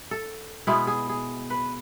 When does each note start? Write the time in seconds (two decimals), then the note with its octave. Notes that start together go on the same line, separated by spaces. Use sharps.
0.11 A4
0.67 B2 G#3 B3 E4
0.87 G#4
1.09 G#4
1.50 B4